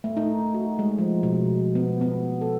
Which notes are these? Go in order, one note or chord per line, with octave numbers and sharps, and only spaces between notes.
A3
D#4
F#4
G#3
F3
B2
B3
B3
A4